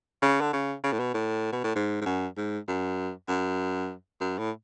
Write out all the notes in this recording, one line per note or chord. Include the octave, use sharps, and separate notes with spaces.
C#3
D3
C#3
C#3
A2
B2
A2
B2
A2
G#2
G#2
F#2
G#2
F#2
F#2
F#2
A2